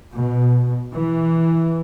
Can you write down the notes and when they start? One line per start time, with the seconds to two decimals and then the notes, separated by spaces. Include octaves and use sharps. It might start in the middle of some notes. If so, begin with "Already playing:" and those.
0.14 B2
0.94 E3